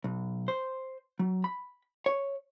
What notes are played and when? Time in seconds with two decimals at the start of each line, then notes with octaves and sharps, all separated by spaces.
0.04 B1
0.48 C5
1.19 F#3
1.44 B5
2.06 C#5